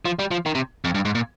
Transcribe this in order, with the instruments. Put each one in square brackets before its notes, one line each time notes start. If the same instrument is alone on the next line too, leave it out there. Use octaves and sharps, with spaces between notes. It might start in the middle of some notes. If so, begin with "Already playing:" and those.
[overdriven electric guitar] F3
G3
F3
D#3
C3
F2
G2
G#2
A#2